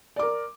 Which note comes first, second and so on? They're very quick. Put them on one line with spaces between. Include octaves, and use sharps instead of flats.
D5 D6 A#4